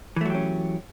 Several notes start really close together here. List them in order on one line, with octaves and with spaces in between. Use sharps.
E3 A3 F#3 G4 C#4